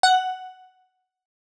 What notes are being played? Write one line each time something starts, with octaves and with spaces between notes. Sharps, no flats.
F#5